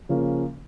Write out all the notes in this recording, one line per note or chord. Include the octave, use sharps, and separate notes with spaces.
C#3 F3 A#3 C#4